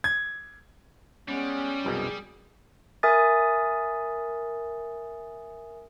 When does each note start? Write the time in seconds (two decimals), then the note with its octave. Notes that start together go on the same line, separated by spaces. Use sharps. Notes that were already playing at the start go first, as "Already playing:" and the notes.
0.04 G#6
1.28 G3 G#3 B3 C#4
1.85 C2 F#2 B2 G#4
3.03 A#4 E5 G#5 D#6 A6